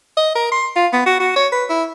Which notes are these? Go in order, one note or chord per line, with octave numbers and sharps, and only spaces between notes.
D#5
A#4
C6
F4
B3
F#4
F#4
C#5
B4
E4